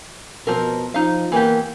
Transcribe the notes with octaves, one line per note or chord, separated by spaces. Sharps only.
B2 F3 C4 A#4
F3 D#4 F5
E3 A#3 B3 G4